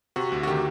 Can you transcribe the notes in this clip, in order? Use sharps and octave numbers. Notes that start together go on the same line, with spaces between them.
C3 F#4
D2
F#4
D#3 G4